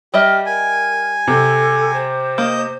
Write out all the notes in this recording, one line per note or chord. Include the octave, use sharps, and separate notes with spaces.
G3 G4 D#5 E5 F6
A#4 G#5
C3 A4
C5
A#3 D#5 G6